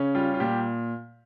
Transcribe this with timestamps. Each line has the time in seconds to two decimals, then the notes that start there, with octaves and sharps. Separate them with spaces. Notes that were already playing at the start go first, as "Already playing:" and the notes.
Already playing: C#3 C#4
0.15 G3 F4
0.34 F4
0.40 A#2 G4